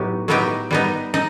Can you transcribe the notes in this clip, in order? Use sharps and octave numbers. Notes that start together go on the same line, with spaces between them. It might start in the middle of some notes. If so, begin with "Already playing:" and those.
Already playing: A2 F#3 B3 D#4 G4
A2 F#3 B3 D#4 G4
G3 B3 D#4
D#4